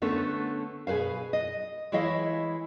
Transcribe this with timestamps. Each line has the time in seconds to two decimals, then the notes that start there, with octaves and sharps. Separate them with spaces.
0.02 D3 A3 B3 C#4 A4
0.87 B2 G#4 B4 C5 F5
1.33 D#5
1.92 E3 G#3 E4 C#5 D#5 F5